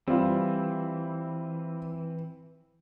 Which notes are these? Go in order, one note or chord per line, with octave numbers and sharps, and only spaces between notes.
E3 G3 C4 F4